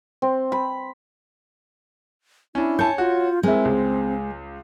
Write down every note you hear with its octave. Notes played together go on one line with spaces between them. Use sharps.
C4
B5
C#4 D4 E4
C#5 G#5 A5 G6
F4 F#4
G#3 C4 E4 A#4
C#2